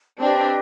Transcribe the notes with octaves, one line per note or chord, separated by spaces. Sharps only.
C4 D4 G4 B4 D#5 G5